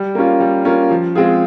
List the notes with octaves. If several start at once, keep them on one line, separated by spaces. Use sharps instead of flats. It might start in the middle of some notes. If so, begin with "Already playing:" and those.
Already playing: G3
A#3 C#4 F4
G3
A#3 C#4 F4
F3
G#3 C4 F4 G#4